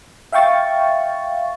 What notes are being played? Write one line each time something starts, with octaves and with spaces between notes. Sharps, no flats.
E5 F5 G5 C#6 A6